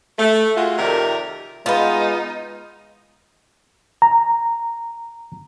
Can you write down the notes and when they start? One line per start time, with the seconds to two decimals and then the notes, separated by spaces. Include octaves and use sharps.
0.19 A3
0.56 G#3 F4 F#4
0.78 F2 C3 D#3 A#4 D5 E5
1.66 G#3 B3 D#4 F4
4.02 A#5